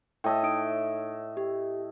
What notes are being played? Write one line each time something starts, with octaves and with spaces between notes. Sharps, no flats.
A2 D#5 E5 G5 A5
D#4 D#6 D7
G4